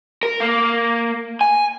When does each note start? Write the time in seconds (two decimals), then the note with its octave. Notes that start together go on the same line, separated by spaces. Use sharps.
0.23 A#4
0.40 A#3
1.41 G#5